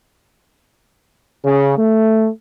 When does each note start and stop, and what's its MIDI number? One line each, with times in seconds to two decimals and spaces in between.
1.45 1.74 49
1.78 2.29 57